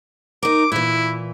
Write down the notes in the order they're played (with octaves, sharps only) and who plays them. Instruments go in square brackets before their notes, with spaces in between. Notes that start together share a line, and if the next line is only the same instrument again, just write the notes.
[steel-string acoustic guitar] D#4 A#4 [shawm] D6
[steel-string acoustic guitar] A#2 E3 [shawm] E4